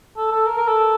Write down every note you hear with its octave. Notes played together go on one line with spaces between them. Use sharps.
A4
A4
A#4
A#4
A4